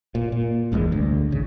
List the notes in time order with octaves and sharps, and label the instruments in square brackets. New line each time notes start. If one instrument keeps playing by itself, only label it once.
[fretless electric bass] A#2
A#2
G#1 E2 G2 G#3
D2
A1 C#3